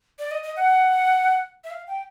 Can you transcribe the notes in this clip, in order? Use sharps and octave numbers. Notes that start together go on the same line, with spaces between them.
D5
D#5
D#5
F#5
E5
F5
G5